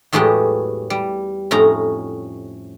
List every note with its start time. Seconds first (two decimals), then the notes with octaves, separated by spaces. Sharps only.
0.13 E2 A2 F#3 G#3 B3 G4
0.90 G3
1.51 F2 A2 C#4 D#4 A#5